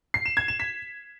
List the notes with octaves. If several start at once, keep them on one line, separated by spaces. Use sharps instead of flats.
C7
E7
G#6
E7
B6